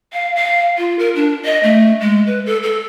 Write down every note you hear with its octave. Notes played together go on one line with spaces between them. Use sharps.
F5
F5
F4
A#4
D4
D#5
A3
G#3
B4
A4
A4